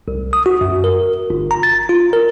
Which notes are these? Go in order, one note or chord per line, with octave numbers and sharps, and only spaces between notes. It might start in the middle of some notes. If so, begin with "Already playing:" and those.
C2
D#6
F#4
F#2
A#4
G1
A#5
A6
F4
A#4